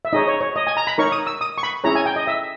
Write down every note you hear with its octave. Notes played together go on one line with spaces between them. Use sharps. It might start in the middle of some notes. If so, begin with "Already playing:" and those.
E5
D#4 G#4 C#5 D#5
C#5
C#5
D#5
G#5
A#5
B5
D#4 A#4 C#5 C#6
D#6
E6
D#6
C#6
B5
C#4 E4 G#4 C#5 A#5
G#5
G5
D#5
E5